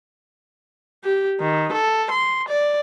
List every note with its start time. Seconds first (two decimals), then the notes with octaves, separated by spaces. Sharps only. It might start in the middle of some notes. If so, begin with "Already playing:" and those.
1.04 G4
1.40 D#3
1.72 A4
2.11 C6
2.48 D5